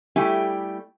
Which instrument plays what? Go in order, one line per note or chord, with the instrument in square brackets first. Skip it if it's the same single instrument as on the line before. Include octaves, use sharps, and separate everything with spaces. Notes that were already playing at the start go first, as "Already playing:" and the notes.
[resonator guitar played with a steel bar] G3 A3 E4 G4 G#5